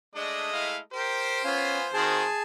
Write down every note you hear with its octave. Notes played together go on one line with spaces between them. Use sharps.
G#3 A3 D4 D#5
E4 F5
G4 A#4 C5
B3 C#4 F4 G#5
D#3 C4 F#4 G#4 G#5 A5